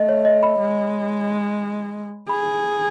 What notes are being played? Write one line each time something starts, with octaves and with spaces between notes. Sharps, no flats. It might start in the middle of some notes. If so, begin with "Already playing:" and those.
Already playing: A3 D#5
C#5
D#5
B5
G#3
G#4 B5